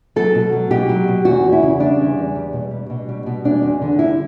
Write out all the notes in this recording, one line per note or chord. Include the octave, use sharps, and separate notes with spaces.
F#3 A4
B2
F#3
B2 G4
F#3
B2
E2 F#4
E2
E4
C#3
G3 D4
E2
E2
G3
B2
G3
B2
G3
B2
E2 D4
E2
D3
G3 E4